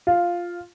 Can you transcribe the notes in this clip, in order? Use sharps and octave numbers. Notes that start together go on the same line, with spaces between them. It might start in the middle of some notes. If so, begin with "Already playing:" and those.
F4